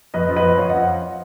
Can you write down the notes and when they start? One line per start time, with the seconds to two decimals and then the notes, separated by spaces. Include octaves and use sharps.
0.14 F2 B4 D#5
0.29 F3
0.36 B4 D#5
0.44 F2
0.58 F2 C#5 F5
0.69 F3 D#5 F#5